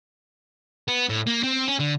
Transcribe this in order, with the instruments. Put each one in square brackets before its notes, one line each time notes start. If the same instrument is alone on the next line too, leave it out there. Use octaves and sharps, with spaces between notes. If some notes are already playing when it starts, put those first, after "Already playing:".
[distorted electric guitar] B3
A2
A#3
C4
C#4
D3